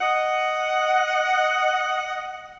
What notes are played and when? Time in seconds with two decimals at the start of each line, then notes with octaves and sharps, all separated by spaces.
0.01 D#5 F#5